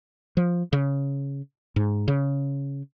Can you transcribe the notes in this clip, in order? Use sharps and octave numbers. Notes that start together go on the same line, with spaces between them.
F3
C#3
G#2
C#3